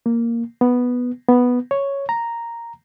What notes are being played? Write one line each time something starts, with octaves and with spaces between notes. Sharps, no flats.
A#3
B3
B3
C#5
A#5